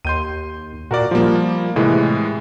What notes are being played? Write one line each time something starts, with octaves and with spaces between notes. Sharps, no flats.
D#2 C6 G6 D#7
A#2 F#4 A#4 D5
F3 G3 A#3 F4
A2 C3 E3 G#3